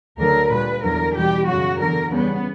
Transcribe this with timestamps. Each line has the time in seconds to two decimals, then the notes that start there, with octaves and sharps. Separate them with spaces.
0.18 D2 D3 F#3 A#4
0.50 A#2 G3 B4
0.82 E2 D3 F#3 A#4
1.14 E2 B2 G3 G4
1.46 F#2 C#3 F#3 F#4
1.78 E2 D3 F#3 A#4
2.10 E2 C#3 G3 B3